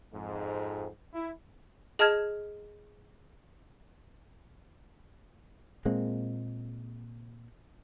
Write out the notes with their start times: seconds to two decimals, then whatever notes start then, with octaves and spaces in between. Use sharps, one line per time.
0.12 F2 G#2
1.13 E4
1.99 G#4 D#5 A5 F6 G#6
5.85 A#2 G#3 A#3 C4